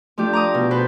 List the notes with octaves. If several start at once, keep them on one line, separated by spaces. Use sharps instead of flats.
F3 A3 D4 G4
A#5 D6 D#6
B2
A4 B4 C5